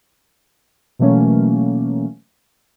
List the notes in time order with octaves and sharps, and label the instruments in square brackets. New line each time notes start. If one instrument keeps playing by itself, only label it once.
[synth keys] B2 E3 F#3 A3 A#3 C#4